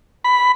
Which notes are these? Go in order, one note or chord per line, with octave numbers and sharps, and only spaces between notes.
B5